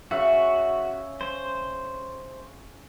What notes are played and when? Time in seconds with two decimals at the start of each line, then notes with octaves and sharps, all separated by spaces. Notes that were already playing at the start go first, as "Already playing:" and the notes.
0.11 C#3 F#4 E5 C#6
1.21 C5